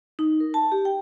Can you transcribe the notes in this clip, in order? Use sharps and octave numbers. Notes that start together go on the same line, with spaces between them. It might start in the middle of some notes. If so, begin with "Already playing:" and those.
D#4
A#4
A5
G4
G5